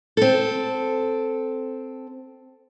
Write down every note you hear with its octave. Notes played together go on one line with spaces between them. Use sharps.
C4 A4